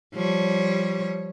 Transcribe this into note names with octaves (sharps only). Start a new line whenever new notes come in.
F3 G3 C#5